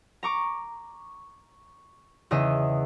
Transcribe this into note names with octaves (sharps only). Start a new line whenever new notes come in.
A#5 C#6 D6
E2 C#3 D#5 E5 D#7